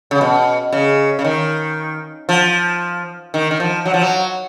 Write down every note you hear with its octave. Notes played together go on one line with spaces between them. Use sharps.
C#3
B2
C#3
C#3
D#3
F3
D#3
D#3
F3
F#3
F3
F#3